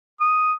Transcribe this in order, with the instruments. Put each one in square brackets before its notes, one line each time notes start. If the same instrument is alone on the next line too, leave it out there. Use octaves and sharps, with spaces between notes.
[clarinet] D#6